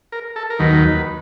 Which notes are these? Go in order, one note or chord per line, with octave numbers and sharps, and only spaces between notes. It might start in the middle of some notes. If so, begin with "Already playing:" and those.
A#4
A4
A#4
D#2 D#3 F#3 B4